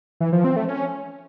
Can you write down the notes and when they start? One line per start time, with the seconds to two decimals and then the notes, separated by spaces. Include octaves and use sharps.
0.20 E3
0.32 F3
0.44 C4
0.56 A3
0.68 C#4